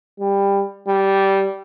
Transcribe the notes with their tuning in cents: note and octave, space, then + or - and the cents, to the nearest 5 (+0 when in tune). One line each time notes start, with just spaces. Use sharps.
G3 +20
G3 -10